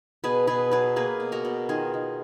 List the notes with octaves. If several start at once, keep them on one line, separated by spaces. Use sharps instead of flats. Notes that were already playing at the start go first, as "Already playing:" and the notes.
B2 G#4 B4
B2 G#4 B4
F#3 G#4 B4
A#3 G#4 B4
B2
F#4 A#4
B2
D#3 F4 G#4
D#3